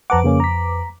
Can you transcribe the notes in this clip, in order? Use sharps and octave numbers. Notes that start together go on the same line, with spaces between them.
F2 B4 F#5 A5 A#5 D6
C#3 A#3 C#4
A#5 B6